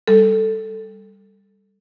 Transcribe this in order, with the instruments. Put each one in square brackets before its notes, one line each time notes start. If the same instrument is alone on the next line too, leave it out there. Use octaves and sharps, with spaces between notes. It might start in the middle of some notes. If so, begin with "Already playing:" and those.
[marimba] G3 A4